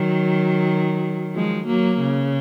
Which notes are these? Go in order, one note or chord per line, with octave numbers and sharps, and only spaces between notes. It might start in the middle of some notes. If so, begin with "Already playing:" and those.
Already playing: D#3 F#3
F3 G#3
F#3 A#3
C#3